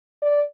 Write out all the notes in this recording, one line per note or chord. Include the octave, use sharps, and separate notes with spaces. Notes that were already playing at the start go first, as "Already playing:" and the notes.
D5